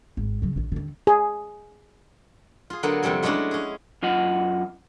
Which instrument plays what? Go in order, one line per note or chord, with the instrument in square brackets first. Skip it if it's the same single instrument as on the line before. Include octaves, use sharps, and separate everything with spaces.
[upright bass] G#1
C#3 F#3
A#1 D#3
D#2 D3
[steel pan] G#4
[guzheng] F4 G#4
D3 F#3 A#3 B3 G#4 A4
F2 C3 G3 A4 G#5
F#3 G#3 A3 C#4 D4 E4
C#4 G#4
[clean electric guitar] F#2 F4 D#5 F#5